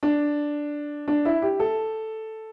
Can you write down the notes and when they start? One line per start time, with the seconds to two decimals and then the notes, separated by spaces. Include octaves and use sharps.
0.03 D4
1.08 D4
1.25 E4
1.42 G4
1.60 A4